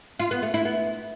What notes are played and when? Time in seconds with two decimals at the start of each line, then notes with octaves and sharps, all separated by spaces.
0.20 F4
0.31 B3
0.42 A3
0.54 E4
0.65 B3